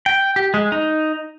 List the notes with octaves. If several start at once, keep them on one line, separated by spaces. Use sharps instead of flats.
G5
G4
G#3
D#4